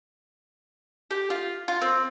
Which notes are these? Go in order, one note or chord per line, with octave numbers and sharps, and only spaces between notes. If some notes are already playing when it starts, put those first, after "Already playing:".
G4
F4
F4
C4